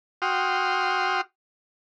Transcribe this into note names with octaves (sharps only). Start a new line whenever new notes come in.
F#4 G5 C6 D#6 F6